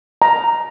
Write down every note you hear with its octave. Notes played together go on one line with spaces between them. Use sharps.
A#5